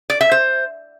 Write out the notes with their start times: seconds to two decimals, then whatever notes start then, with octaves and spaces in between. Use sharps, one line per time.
0.10 D5
0.21 E5
0.32 C5